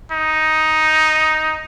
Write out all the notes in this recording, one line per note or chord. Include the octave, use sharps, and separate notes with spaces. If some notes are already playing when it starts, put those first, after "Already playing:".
D#4